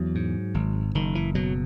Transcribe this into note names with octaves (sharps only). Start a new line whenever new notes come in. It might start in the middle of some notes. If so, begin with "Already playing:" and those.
Already playing: E2 F#3
G#2
G#1
F#1 D#3
E3
B2 F#3